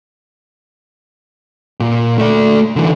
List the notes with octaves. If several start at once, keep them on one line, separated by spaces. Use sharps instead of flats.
A#2
A3 D5
D3 E3